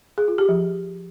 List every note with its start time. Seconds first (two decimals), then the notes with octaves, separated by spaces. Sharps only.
0.18 G#4
0.28 F4
0.38 G4
0.49 F3